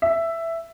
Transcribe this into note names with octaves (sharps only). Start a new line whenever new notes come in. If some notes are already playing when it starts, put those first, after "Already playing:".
E5